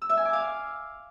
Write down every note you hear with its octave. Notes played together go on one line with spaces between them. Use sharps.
E6
E5
G#5
D6
F5